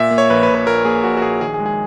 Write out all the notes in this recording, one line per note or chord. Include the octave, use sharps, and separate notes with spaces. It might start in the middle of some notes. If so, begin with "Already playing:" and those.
Already playing: A#2 E5
A#3
C#5
A#1 B4
B4
A#1
B4
A#2 A#4
A#3 G#4
A#1 F#4
F#4
A#1 G#4
D#3 G#4
G#4
G#3
G#4